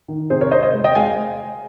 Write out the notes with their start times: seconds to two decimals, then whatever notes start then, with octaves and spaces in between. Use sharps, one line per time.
0.08 D#3
0.30 C3 G#4 C5
0.41 A#4 C#5
0.51 C3 C5 D#5
0.63 C5 D#5
0.74 G#3
0.84 D#5 G5
0.95 G#3 F5 G#5